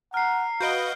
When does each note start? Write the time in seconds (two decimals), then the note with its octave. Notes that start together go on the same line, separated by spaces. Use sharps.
0.14 F#5 A#5 F6 C7
0.61 F#4 B4 D#5 F5 G6 D7 G7